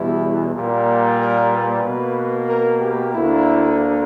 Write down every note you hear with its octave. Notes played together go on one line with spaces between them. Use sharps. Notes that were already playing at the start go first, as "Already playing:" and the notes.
Already playing: E2 B2 G3 E4
A#2 G3 A#3
A#4
B4
B2 A#3
A#4
G4
D2 D3 A#3 E4